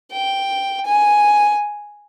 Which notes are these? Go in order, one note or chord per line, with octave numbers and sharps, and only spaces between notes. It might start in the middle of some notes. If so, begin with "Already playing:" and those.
G5
G#5